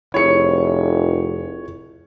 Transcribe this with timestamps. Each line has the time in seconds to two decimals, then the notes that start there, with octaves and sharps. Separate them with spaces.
0.14 F1 E4 F4 G#4 C#5 C#7